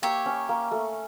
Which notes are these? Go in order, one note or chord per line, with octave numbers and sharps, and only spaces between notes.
A#3 G4 C#5 E5
C#4
A#3
A3